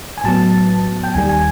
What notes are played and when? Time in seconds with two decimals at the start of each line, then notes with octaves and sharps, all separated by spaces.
0.18 G#5
0.24 A2 F#3 B3 A5
1.04 G5
1.14 D#2 D#3 G3 G#5
1.29 G#5